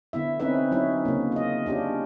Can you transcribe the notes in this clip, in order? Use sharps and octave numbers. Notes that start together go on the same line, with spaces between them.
D3 B3 E4 E5
C4 C#4 D#4 B4 E5
F#3 C#4 D#4 E4
C#3 A#3
F4 D#5
C#4 D4 F4 G4